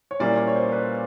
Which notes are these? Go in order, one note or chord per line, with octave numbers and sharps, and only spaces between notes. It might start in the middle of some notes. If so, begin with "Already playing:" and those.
C#5
A#2 G3 A#3 C#4 E4 D5
C#5
C#5
C5
B4